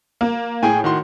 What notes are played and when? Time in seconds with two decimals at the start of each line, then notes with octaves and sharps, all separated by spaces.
0.21 A#3
0.63 A2 G#4 G5 G#5
0.84 D#3 F#4 C6